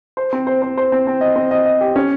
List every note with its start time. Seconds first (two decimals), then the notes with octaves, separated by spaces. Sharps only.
0.17 C5
0.33 C4
0.47 C5
0.62 C5
0.77 C5
0.92 C4
1.07 C4
1.21 D#5
1.36 C4
1.51 D#5
1.66 D#5
1.81 G4
1.96 C#4